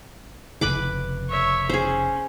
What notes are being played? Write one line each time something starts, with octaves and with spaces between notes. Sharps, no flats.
F1 C#3 B4 B5 D6
C#5 E5
C#4 G#4 C5